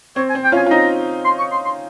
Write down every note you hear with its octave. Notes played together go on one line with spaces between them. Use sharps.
C4 C#5
G#5
C4
G5
C#4 F4 G#5
F4
C4 D#4 A#5
C6
C#6
C6
C6